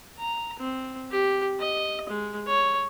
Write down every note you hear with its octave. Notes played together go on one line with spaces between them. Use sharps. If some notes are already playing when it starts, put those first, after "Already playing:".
A#5
C4
G4
D#5
G#3
C#5